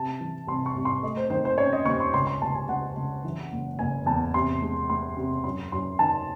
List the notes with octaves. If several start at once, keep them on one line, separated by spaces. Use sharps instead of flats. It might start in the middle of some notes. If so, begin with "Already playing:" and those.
Already playing: C3 A5
E3
C2 C6
C#6
C2
C6
A3 D#5
C5
D#3 C5
C5
C#4 C#5
D#5
D#2 C#6
C6
C#2 C6
C6
C#2 A5
G#5
C#2 F#5
C#2
E3
F#1
F#1 G#5
E2 A5
C3 C6
G#3
G#3 C6
C3
F#2 C6
F#2 C6
D#3 A5